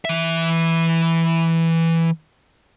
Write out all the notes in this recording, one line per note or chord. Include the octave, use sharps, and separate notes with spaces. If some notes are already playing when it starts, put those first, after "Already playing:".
E3 E5